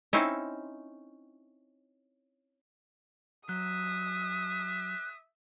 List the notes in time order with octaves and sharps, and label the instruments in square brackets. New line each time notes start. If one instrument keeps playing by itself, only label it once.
[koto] C4 C#4 D#4 E4
[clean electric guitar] F#3 [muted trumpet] E5 [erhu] D#6 [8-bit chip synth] F#6